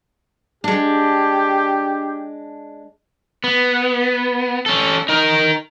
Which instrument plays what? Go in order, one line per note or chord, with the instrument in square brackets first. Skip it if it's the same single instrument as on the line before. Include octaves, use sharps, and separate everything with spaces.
[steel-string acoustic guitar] G#3 D4 [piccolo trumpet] G4
[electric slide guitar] B3
C#4 A4
D#4 A#4